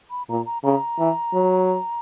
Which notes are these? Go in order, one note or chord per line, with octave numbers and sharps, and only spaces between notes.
B5
A#2 A#5
A#5
C#3 A#5
E3
F#3